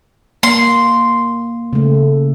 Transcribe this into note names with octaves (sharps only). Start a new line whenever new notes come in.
A#3 C6
C#3 A3